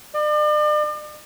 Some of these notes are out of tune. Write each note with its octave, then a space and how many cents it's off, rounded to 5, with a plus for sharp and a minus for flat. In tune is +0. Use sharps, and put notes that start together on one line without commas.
D5 +40